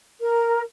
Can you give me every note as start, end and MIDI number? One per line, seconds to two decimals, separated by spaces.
0.19 0.62 70